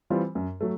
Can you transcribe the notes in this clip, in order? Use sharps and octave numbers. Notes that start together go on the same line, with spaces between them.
E3 G3 C4 F4
F#2
F#3 A3